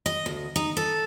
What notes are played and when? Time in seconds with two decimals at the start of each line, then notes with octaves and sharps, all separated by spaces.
0.06 D#5
0.26 D2
0.56 D#4
0.77 A4